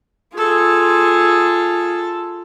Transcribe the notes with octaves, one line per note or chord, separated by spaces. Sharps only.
F4 G#4 A4